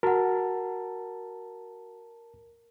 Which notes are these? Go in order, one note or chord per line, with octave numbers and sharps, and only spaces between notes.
F#4 A#4 F#5 A5